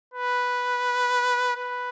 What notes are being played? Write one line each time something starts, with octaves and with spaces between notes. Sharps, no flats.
B4
B4